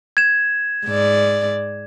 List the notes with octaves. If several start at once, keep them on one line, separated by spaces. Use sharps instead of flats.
G#6 E7
G#2 D5